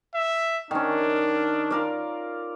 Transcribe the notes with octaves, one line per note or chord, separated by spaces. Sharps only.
E5
D#3 C#4 D4
F4 A#4 D5